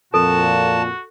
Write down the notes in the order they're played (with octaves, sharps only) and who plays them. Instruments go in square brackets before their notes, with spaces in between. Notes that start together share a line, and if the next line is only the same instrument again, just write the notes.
[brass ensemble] F2 A#2 [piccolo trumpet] F#4 [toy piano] A4 [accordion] A5